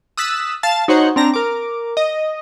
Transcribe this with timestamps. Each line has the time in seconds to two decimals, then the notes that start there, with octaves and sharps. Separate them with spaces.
0.17 D#6 E6 F#6 A6 B6
0.63 F5 A5 A6
0.88 D#4 F#4 C5 C#5 F#5
1.16 C4 D4 A#5 A#6
1.34 A#4 D6
1.97 D#5